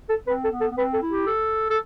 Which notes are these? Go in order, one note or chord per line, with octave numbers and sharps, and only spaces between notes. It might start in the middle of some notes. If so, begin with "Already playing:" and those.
A4
C4 B4
A4
B3
A4
B3
C4 B4
A4
E4
G4
A4
A4